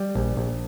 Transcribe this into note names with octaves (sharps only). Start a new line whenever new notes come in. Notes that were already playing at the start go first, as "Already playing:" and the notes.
Already playing: G3
A#1
A#1